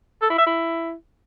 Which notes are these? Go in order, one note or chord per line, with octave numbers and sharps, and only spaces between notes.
A4
E4
E5
E4